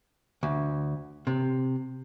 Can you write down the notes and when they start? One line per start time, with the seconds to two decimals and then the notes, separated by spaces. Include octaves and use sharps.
0.43 D2
1.27 C3